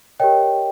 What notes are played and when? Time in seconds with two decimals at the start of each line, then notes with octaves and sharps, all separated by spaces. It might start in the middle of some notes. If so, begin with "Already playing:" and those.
0.19 G4 A#4 C#5 D#5 G5